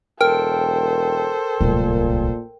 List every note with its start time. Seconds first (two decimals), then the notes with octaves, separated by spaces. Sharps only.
0.21 E1 A4 A#4 C5 G5
1.61 D1 C2 A#2